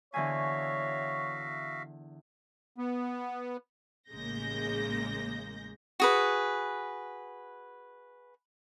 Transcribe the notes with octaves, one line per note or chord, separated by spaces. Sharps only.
E2 D3 F#4 C#5 E5 F5 G#5
B3
A1 C#3 G#3 A#3 G6 A#6
F#4 G#4 B4